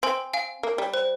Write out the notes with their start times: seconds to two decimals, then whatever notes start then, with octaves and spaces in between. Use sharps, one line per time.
0.03 C4 G#5 C6
0.34 F5 G#5
0.63 A#3
0.78 G3
0.94 C5